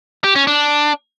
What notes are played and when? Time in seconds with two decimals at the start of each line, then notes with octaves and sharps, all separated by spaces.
0.24 G4
0.36 C#4
0.47 D4